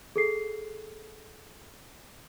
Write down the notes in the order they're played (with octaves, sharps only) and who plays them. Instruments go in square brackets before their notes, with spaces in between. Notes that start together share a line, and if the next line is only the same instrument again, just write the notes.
[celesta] G#4 A4 C7